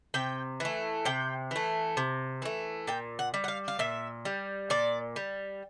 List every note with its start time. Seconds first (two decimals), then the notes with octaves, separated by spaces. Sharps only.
0.14 C3 G5
0.60 E3 A3
1.05 C3 G5
1.51 E3 A3
1.97 C3
2.42 E3 A3
2.87 A#2 G5
3.19 F#5
3.34 G3
3.44 F#5
3.48 F5
3.68 F5
3.79 A#2 E5
4.25 G3
4.70 A#2 D5
5.16 G3